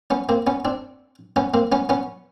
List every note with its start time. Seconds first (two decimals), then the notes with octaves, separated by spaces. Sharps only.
0.10 B3 C#4
0.29 A#3 C4
0.47 B3 C#4
0.65 C4 D4
1.36 B3 C#4
1.54 A#3 C4
1.72 B3 C#4
1.89 B3 C#4